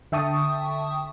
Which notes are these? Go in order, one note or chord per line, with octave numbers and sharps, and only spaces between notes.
D3 E5 G5 A5 C#6 D#6